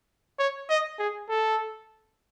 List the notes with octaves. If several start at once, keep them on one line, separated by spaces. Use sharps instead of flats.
C#5
D#5
G#4
A4